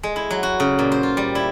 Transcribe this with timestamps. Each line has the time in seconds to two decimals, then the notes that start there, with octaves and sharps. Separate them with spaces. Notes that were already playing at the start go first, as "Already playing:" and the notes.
0.03 G#3
0.16 E4
0.31 F#3
0.43 F#4
0.60 C#3
0.79 A#2
0.92 C5
1.03 F4
1.17 G3
1.35 E4